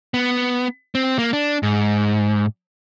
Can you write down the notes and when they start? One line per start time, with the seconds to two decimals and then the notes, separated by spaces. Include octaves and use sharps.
0.14 B3
0.95 C4
1.19 A#3
1.33 D4
1.63 G#2